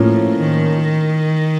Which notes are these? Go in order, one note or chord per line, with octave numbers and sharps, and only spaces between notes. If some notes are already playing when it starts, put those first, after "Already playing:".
Already playing: A2 F3 A#3 C#4
D#3